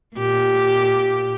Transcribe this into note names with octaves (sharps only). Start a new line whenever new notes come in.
A#2 G4